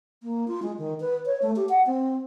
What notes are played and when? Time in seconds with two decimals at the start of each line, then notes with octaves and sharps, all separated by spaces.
0.23 A#3
0.48 F4
0.62 G#3
0.78 D#3
1.00 B4
1.26 C#5
1.42 A3
1.56 G4
1.69 F#5
1.86 C4